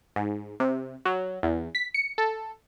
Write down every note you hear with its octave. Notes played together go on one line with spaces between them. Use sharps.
G#2
C3
F#3
E2
B6
C#7
A4